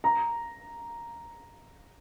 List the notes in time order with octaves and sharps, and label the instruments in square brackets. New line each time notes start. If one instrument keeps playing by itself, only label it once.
[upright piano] A#5